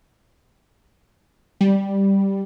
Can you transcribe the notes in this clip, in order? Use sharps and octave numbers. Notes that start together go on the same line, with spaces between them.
G3